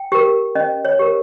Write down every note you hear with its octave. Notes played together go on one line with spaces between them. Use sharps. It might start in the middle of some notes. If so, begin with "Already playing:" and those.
Already playing: G5
G4 A#4
C#4 D#5
C#5
G4 A#4